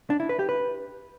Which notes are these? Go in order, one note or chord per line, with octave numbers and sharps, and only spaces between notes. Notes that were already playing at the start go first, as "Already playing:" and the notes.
D4
E4
B4
G4
B4